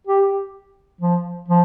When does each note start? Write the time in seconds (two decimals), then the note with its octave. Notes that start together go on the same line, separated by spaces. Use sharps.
0.07 G4
1.01 F3
1.48 F3